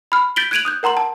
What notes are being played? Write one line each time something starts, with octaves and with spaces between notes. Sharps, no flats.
B5 F6
G6 A6 B6 D7 F#7 G7
F#6 G#6 D7 D#7 F7 F#7
D#6 F#6 G6
A#4 F#5 A#5 C6 F#7
A5